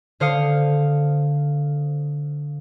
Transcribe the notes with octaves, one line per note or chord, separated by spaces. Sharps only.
D3 C5 F5 D#6 C#7